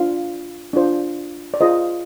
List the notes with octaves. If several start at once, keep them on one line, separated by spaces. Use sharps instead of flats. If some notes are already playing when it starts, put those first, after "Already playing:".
Already playing: D4 F4 C5 F5
D4 F4 C5
D5
F4 G#4 C5 D#5